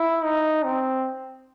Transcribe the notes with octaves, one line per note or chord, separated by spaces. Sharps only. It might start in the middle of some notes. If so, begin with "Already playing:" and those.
Already playing: E4
D#4
C4